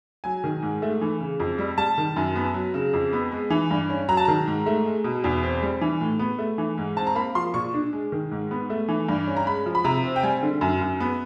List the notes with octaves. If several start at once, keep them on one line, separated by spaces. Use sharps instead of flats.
F#3 G#5
D#3
G#2
A3
E3
C#3
F2
G3
G3 A5
D#3
F#2
B3
F#3
C#3
F2
B3
G#3
E3
G2
C#4
F#3 A#5
A5
D#3 A#5
G#2
A3
G#3
B2
E2
C4
G3
E3
A2
B3
A3
E3
G#2
C4 A5
A#5
A#3 B5
F3 C6
A#2 C#6
D4
G#3
D#3
G#2
B3
A3
E3
G2
C#4
A#5
G#3 B5
F3
B5
C3 A#5
C4
G5
G3 G#5
D3
F#2
F#2
B3